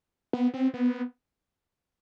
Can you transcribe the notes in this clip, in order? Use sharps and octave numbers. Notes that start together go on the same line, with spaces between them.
B3
C4
B3